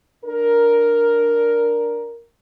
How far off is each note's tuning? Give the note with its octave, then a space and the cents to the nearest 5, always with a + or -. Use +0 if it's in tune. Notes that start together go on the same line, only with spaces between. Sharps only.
D4 +0 A#4 +5